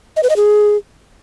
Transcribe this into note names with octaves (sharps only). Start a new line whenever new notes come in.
D#5
B4
D#5
G#4